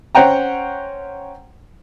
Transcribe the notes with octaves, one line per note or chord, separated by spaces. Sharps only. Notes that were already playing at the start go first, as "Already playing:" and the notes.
C#4 C5 F#5 G5 A#5